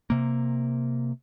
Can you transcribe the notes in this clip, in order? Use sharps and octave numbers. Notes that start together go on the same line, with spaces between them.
C3 A#3